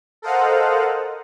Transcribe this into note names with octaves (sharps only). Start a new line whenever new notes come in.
A4 A#4 C5 D#5 F5 F#5